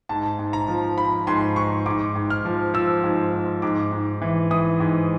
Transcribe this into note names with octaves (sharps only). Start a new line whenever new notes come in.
G#2 A5
G#2
A#5
F3
F3 B5
G#2 C6
G#2 C#6
G#2 D6
G#2
F6
F3
F3 E6
G#2
G#2
G#2 D6
G#2
E3
E3 D#6
G#2